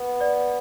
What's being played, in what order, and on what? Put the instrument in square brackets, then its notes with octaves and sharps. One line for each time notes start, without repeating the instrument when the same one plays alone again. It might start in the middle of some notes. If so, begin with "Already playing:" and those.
Already playing: [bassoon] B3
[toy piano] D5